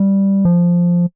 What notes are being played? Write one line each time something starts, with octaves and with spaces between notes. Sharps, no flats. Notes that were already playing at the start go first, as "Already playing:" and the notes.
Already playing: G3
F3